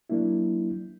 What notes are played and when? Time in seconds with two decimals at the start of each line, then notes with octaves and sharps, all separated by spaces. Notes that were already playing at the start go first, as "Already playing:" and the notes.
0.10 F#3 A#3 D4 E4